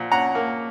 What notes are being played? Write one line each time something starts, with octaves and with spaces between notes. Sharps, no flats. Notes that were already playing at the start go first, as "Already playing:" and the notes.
Already playing: A#2 F3 A#3 F#5
C#4 F#5 A#5
A#3